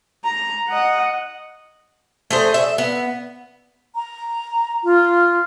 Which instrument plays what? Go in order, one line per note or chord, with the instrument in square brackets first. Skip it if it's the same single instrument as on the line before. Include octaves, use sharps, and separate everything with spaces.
[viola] A#5
D#5 F#5
[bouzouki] A3 G#4 C5
E5
B3
[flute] A#5
F4